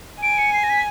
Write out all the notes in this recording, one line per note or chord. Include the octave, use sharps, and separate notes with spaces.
G#5 D7
C#7
C7
A#6
B6